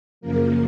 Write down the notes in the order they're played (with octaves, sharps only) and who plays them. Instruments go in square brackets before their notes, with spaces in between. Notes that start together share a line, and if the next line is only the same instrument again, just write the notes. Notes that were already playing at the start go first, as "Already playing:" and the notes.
[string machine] F#2 C#3 F3 A#3 A#4